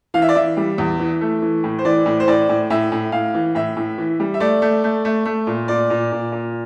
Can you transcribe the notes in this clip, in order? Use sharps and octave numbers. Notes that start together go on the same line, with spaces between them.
E3 F5
E5
D5
E3 E5
G3
E2
E3
A3
E3
A2
C5
E3 D5
A2
C5
A2 D5
A2
A2 E5
A2
A2 F5
E3
A2 E5
A2
E3
G3
E5
A3 D5
A3
A3
A3
A3
A#2
A#2 D5
A#2
A#2
A#2